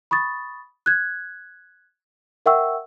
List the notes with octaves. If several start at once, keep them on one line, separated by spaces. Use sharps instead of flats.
B5 C#6 D#6 A6
F#6 G#6
A#4 E5 F#5 G5 C#6 E6